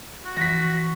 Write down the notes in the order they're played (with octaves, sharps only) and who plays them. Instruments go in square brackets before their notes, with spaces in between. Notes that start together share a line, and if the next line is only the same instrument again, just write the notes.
[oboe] F#4
[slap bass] E3 F3 [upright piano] A#6 B6